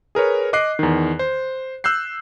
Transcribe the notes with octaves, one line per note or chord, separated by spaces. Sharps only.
G#4 A#4 B4 C#5
D#5 D6 F#6 C7
E2 D#3
C5
E6 F#6 G6 C7